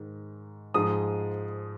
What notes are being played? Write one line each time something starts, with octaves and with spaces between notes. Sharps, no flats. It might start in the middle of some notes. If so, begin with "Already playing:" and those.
Already playing: G#2 D#3
G#2 F3 G#3 D#6